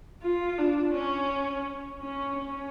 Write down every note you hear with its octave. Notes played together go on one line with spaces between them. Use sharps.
F4
D4
C#4
C#4
C#4